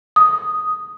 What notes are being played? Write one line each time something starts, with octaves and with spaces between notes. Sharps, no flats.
D#6